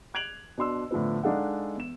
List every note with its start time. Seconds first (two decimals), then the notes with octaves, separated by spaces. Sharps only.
0.14 F#6 G#6 D7 F7 F#7
0.58 B2 D4 C6 E6
0.91 A2 D3 F3 B3
1.24 G#3 D4 D#4 A4 F5 F#5
1.76 E2 E7